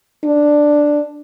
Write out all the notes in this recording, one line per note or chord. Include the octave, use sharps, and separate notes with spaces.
D4